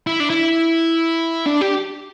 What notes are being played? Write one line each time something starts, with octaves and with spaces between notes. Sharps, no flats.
E4
D4
E4
D4
G4